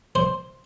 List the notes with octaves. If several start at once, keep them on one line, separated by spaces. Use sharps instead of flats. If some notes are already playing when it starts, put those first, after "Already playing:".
C5